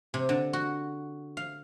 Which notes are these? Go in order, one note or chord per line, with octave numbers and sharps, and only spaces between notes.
C3
D3
F#4
F5